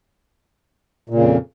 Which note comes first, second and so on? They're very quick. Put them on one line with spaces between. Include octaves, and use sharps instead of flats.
A#2 C#3 F2